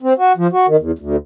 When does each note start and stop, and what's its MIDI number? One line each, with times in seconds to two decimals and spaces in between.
0.02 0.13 60
0.18 0.32 66
0.37 0.47 53
0.52 0.66 66
0.68 0.76 51
0.79 0.91 40
0.99 1.16 38